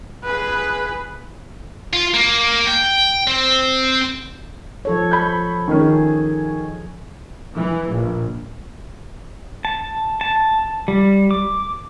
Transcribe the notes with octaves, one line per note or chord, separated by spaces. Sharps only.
G#4 B4
F4
A#3
G5
C4
F3 A4 C#5
B5 G6
D#3 C#4
G#4
E3
A#1
A5
A5
G3
D6